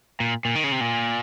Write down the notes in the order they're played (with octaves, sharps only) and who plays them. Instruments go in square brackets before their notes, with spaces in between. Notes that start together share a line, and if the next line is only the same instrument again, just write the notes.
[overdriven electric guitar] A#2
A#2
D#3
C#3
C3
A#2